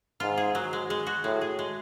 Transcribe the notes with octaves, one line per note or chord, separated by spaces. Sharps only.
G#2 F4
G#4
F#3
G#3
G#3
F#4
A2 G#3
G#4
G#3